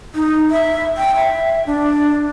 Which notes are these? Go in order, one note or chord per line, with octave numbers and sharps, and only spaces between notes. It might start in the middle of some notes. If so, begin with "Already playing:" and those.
D#4
E5
G5
E5
D4